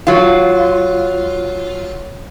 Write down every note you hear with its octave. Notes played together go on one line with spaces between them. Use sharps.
F#3 F4